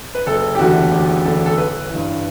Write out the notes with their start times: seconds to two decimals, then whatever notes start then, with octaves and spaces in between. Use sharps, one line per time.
0.15 B4
0.26 F#1 A4
0.55 G4
0.59 E2 D3 A3 F#4
0.92 F#1 G4
1.24 E2 D3 A3 A4
1.46 A4
1.58 A1 B4
1.90 G2 E3